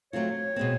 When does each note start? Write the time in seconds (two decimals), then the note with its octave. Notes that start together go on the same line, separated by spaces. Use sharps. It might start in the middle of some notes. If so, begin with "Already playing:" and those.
0.13 F#3 A3 C4 F4 C#5
0.56 B2 G#3 C4